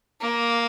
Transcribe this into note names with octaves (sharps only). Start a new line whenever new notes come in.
A#3